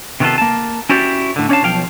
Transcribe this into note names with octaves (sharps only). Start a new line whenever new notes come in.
C3 D#3 B3 E4 F4 A4
A#3 A5
C#4 E4 F#4 G4 C5 D5
A2 D3
C#4 D4 C#5 D5 F5 A5
B1 F3 F5 G5